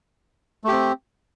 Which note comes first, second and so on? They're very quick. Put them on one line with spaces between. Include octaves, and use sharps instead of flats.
A3 G4 C4